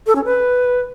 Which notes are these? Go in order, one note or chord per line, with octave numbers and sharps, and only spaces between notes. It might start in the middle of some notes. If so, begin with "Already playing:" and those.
A4
C#4
B4